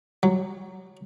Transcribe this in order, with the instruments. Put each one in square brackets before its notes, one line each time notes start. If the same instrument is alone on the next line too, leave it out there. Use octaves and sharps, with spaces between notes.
[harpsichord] F#3